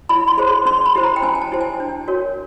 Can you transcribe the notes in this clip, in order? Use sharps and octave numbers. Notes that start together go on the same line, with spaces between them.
E4 B5
C6
G#4 C5
C6
C#4 C6
B5
E4 G4 C5
A#5
G5
C#4 G#5
G#5
A5
E4 G4 C5
G#5
D4
F#4 A#4 C#5